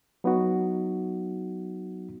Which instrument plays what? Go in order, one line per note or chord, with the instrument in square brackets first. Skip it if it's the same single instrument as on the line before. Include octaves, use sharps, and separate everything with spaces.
[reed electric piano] F#3 B3 D#4 F#4